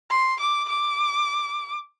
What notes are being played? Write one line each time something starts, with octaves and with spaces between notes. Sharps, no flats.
C6
D6
D6